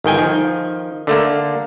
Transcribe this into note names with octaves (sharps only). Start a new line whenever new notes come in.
G1 D#3 G5 G#5
D#3 F3
D3 A3 A#3